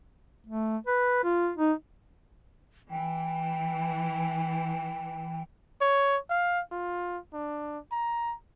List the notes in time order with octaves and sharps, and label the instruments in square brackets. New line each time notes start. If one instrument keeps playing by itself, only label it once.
[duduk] A3
B4
F4
D#4
[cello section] E3 [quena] G5
[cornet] C#5
F5
F4
D4
A#5